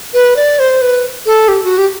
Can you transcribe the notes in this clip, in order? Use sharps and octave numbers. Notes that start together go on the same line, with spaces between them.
B4
D5
C5
B4
A4
G4
F#4
G4